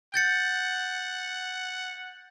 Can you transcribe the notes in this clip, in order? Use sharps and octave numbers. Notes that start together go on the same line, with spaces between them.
F#5 G6 A6 C#7